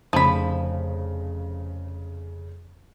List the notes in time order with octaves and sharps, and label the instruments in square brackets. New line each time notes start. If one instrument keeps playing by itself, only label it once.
[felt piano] F1 C#3 [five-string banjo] F3 B5